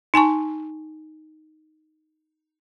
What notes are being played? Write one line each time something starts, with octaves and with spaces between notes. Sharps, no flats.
D#4 G#5 A5 C#6